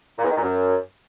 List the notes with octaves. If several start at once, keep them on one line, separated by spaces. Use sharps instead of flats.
A#2
E2
D#3
A#2
F#2